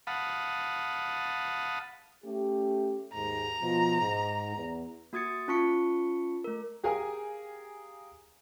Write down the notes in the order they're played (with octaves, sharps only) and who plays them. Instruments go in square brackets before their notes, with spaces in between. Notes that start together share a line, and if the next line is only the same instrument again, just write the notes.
[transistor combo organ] F5 F#5 A5 B5 D#6
[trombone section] A3 C#4 G4
[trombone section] D#2 G#2 [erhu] A#5
[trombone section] B2 F3
G#2
E2
[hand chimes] A#3 F#4 D#6 G#6 A6 C#7
C#4 F4 A5 C#6 B6 C#7
A3 A#4
[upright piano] G4 G#4 A#4 F5 G#5